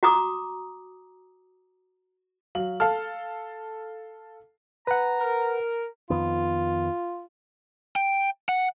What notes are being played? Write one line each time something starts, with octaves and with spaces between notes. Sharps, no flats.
F#4 A#5 D6 D#6
F#3 F5 F#7
A4 F5 A5 F6
B4 F#5 A#5
A#4
F2 D#3 B3 F4
G5
F#5